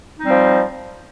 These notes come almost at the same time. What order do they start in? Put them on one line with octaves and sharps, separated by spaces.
D#4 C4 G3 F3